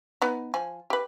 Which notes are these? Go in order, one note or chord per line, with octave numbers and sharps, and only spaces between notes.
B3 D#4
F3 G#5
G4 B4